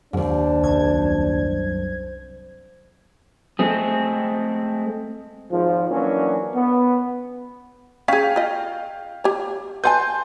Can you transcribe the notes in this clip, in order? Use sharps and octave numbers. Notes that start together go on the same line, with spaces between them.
D#2 G#2 D4 C5
C2 F#2 G#6
G#3 A3 C4 G#4
G#1 F3
E3 F#3 A#3 C#4 D4
B3
C#4 G#4 F5 G5 B6
F4 D#5
G4 C#5
B4 F#5 G#5 A5 C6 G6